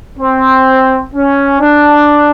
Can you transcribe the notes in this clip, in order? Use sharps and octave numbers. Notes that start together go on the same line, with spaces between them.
C4
C#4
D4